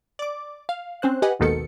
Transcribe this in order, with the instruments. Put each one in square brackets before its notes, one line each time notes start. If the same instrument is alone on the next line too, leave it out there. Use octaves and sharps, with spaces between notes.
[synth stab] D5 D6
F5
C4 C#4 C5 F#6
G4 B4 D#5 F#5 G#5
G#1 D#2 B2 D#3 A4 C#7